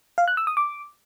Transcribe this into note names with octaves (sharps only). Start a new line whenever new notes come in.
F5
F#6
E6
D#6
D6